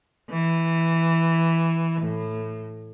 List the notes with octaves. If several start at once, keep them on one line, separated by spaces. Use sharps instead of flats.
E3
A2